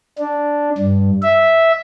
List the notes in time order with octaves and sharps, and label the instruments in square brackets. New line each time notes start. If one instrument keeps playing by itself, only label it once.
[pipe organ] D4
G2
E5